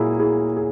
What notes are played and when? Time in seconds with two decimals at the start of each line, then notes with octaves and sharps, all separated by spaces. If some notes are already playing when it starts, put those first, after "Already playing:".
Already playing: A#2 F#3 A#3 E4 G#4
0.19 E4 G#4
0.57 G#4